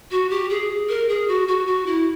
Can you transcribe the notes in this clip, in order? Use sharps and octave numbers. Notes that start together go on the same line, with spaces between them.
F#4
G4
G#4
A#4
G#4
F#4
F#4
F#4
E4